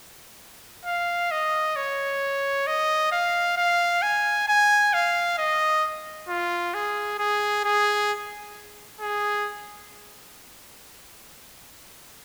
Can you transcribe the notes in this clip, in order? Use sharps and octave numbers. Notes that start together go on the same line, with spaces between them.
F5
D#5
C#5
D#5
F5
F5
G#5
G#5
F5
D#5
F4
G#4
G#4
G#4
G#4